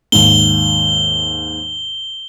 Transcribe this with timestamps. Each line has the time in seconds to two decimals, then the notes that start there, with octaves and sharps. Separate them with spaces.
0.12 D#2 G#2 G7